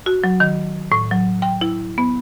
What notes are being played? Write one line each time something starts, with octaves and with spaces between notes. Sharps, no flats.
F#4
F#3
D#3
A2
F#3
G5
E4
B3